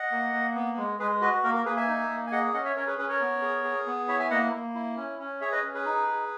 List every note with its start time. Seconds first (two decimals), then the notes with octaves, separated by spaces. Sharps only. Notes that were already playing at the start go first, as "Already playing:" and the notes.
Already playing: D#5 F#5
0.11 A#3
0.33 A#3
0.55 B3
0.77 G#3
0.99 G#3 G#4 B4
1.21 F#4 B4 D#5
1.44 A#3 A#4
1.55 A#4
1.66 A#3 G#4 B4
1.77 E5 G#5
1.88 D#4
2.10 A#3
2.27 G#5
2.32 G#4 D#5 F#5
2.54 C#4 D#5 F#5
2.65 C#5 E5
2.76 C#4 A#4 C#5
2.87 G#4 B4
2.98 C#4 G#4 B4
3.09 A#4 C#5
3.21 B3
3.42 G#4
3.64 G#4
3.86 B3
4.08 E4 C#5 E5
4.19 E5 G#5
4.30 A#3 D#5 F#5
4.52 A#3
4.75 E4
4.97 C#4
5.19 C#4
5.41 G#4 C#5 E5
5.52 B4 D#5
5.63 C#4
5.74 G#4 B4
5.85 D#4
6.07 G#4